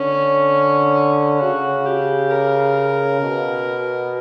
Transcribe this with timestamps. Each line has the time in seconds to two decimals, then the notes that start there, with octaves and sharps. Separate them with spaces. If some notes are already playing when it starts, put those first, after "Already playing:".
Already playing: D3 C#4
1.40 C#3 F#4
1.85 G4
2.30 A#4
3.21 B2